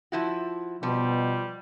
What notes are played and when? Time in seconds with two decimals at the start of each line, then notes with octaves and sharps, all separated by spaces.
0.12 F3 E4 F#4
0.83 B2 F3 G3